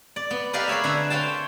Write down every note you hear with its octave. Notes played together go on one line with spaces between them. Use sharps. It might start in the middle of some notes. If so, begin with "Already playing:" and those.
D5
B3
G4 A#4 B4 D5 D#5 F5
G#4 A#4 C#5 E5
D3 B4 E5
C5 C#5 F5 G5 A5